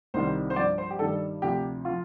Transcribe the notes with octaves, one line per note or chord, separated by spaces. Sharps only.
C2 C3 D#3 G3 C5
C5
G2 F3 D5
C5
G4
G2 D#3 G3 A4
D2 C3 F3 G4
F3 F4